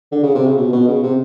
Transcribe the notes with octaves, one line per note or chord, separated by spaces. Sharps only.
D3
C#3
C3
C#3
B2
B2
C#3
C3